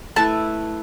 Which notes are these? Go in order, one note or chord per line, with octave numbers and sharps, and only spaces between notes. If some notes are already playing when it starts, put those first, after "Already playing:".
A3 E4 B4 A5